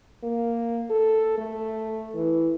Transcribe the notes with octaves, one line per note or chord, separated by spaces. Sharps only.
A#3
A4
A3
E3